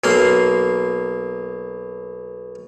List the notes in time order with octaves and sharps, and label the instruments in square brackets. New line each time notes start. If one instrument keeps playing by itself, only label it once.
[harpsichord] B1 A#3 C6